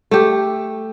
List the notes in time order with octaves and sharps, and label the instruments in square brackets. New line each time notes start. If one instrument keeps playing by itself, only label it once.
[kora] A3 G4